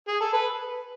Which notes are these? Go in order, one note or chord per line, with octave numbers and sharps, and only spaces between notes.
G#4
A4
B4